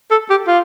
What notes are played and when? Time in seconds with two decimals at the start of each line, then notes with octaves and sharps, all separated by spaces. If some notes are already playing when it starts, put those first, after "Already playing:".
0.11 A4
0.30 G4
0.47 F4